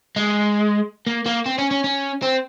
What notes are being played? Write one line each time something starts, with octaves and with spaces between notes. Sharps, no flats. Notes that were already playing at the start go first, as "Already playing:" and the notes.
G#3
A#3
A#3
C4
C#4
C#4
C#4
C4